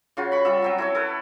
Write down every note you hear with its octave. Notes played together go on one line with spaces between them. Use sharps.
C#3 F4 F#4
B5 C#6
G3 F4 E5
F#3 C4 A#5
E4 A4 C#5
A4 B4